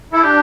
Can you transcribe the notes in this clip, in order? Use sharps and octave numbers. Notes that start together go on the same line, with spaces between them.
E4 A4
D4 G4